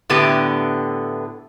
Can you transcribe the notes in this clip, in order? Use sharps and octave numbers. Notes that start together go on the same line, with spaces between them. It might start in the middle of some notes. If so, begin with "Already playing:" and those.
A2 D3 B3 E4 G4